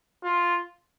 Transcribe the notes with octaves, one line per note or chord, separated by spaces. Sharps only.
F4